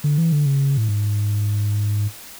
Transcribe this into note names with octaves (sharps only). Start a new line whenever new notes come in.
D3
E3
D3
C#3
A2
G#2